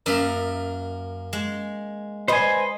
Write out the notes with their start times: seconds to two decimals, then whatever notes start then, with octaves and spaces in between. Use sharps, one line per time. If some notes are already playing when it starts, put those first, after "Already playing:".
0.06 F#2 A#3 A#4 E5
1.33 G#3
2.28 B4 C5 D#5 G#5